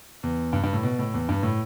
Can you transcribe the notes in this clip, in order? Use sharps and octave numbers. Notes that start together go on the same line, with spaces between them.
E2
G2
G2
A2
B2
A2
E2
G2
A2